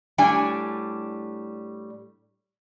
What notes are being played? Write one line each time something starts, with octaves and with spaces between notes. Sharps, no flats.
A2 G3 D4 G#5